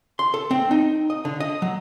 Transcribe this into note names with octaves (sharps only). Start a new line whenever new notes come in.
C6
A4
C4
D#4
D#5
D3
D#5
F#3